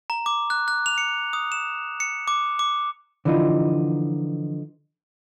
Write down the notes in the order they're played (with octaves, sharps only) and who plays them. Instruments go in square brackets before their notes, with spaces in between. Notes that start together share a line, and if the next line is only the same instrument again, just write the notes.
[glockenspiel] A#5
D6
F#6
F#6
F7
C#7
D#6
E7
C#7
D6
D6
[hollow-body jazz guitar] D3 E3 F3 D#4 F4